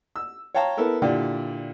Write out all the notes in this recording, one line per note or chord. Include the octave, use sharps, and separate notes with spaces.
E6
C#5 F5 G5 A5 A#5
B3 E4 A4 A#4
A#2 D3 E4 G4 D5